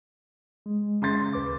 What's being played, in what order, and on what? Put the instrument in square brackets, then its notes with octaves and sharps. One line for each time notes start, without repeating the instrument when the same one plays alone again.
[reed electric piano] G#3
[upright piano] C#3 C6 A6
[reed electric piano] D#2 B4 D6